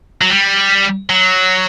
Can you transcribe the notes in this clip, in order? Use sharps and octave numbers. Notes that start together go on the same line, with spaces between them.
F#3
G3
F#3